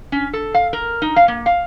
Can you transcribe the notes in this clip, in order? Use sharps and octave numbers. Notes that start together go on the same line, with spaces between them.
C#4
A4
F5
A#4
D#4
F5
A#3
F5